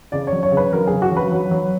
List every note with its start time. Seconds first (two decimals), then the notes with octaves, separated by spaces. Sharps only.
0.12 C#3 D5
0.27 F#3 C#5
0.43 C#5
0.52 C#3
0.57 B4
0.72 F#3 A#4
0.87 C#3 G#4
1.02 F#4
1.11 F#3
1.17 B4
1.32 F#3
1.51 F#3